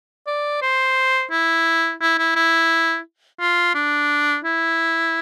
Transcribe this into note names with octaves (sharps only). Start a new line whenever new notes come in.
D5
C5
E4
E4
E4
E4
F4
D4
E4